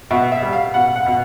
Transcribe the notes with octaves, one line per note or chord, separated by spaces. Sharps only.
B2 E5
E5
G3
F5
B2 F#5
F#5
B2